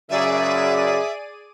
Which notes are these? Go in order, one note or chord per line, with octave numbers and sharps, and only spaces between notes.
F#2 C#3 G#4 D5 E5 D#7